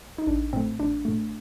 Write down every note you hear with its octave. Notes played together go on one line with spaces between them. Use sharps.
D#4
A1 D4
A2 A3 C4
A1 D4
A2 A3